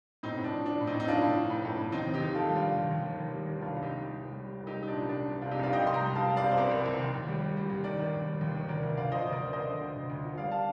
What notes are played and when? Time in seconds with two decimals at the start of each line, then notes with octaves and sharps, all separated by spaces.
0.23 A2 C4 D#4
0.37 A2
0.44 D4
0.51 F3
0.66 F3 D4
0.81 A2
0.87 C4 D#4
0.94 A2
1.00 D#4
1.08 F3 D4 F4
1.22 A2
1.37 F3
1.50 A2
1.65 A2
1.79 A2
1.92 D#2 C4 D#4
2.07 D#2
2.14 D#4 G4
2.20 D#2
2.35 D#3 F4 A4
2.49 G3
2.56 D4 F4
2.63 D#2
2.77 D#2
2.91 D#2
3.05 D#3
3.20 D#2
3.33 G3
3.47 D#2
3.61 C2 D4 F4
3.76 C2
3.82 D#4 G4
3.90 G3
4.03 G3
4.18 C2
4.32 G3
4.47 G3
4.61 C2
4.67 D#4 G4
4.74 G3
4.83 D#4
4.88 A#2 D4
5.02 C2
5.09 D4
5.16 G3
5.31 C2
5.41 D4 F4
5.46 C3
5.51 D#4 G4
5.59 C2 D5 F5
5.73 C2 D#5 G5
5.87 C2 C6
5.94 G5 A#5
6.01 G3
6.15 C2 F5 A5
6.29 G3
6.37 D5 F5
6.44 C3
6.52 C5
6.57 C2 A#4 D5
6.71 C2
6.86 C2
6.99 D#3
7.14 D#2
7.28 G3
7.42 G3
7.57 G3
7.70 D#2
7.84 D#3 A#4 D5
7.99 D#3
8.13 D#2
8.27 G3
8.41 D#2
8.56 D#3
8.68 D2 A#4 D5
8.83 D2
8.97 D2 D5 F5
9.11 F3 C5 D#5
9.25 D2
9.32 A#4 D5
9.39 D2
9.47 D5
9.53 D2 C5 D#5
9.67 D3
9.81 D2
9.96 D2
10.10 D2
10.24 F3
10.37 G3 D5 F5
10.52 F5 A5